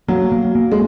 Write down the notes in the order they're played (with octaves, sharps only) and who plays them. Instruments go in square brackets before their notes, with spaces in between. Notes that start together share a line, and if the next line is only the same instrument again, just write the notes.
[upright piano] F#3 [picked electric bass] A#3
[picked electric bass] A#3
A#3
[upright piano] G#3